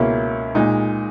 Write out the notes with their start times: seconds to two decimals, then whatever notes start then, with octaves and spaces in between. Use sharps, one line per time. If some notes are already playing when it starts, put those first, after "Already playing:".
Already playing: C#2 B2 A#3 C#4 E4
0.55 A#2 G#3 D#4